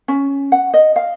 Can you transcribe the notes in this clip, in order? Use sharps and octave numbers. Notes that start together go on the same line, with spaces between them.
C#4
F#5
D#5
F5